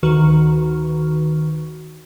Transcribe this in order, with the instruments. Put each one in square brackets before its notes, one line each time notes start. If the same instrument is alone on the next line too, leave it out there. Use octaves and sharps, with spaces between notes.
[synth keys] D2 D#3 F#4 B4 C#6 F6